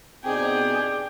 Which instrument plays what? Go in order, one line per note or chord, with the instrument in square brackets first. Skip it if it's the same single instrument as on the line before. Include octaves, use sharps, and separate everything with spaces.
[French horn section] B2 C4 [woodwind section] D4 G4 G5 [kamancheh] D#4 G#4